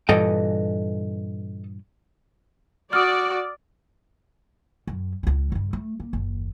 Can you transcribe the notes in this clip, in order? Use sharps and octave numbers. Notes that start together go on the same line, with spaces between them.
G2 A#2 E3 A4 D#5 G5
F#4 D5 D#6 F6
F#2
C#2 C#3
G2 C#3
A3
A#3
F#1 D#2